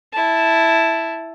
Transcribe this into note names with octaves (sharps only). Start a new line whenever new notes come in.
E4 A5